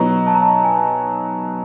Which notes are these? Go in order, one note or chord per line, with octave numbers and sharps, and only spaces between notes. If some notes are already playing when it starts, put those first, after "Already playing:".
Already playing: B2 F#3 B3 D#4 A#5
A5
A#5
A5
G#5